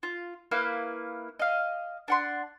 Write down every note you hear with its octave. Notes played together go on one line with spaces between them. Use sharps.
F4
A#3 E4 B4 F5
D#5 F5
D4 F#5 C6